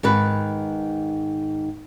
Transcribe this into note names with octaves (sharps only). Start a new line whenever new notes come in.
G#2 D#3 B4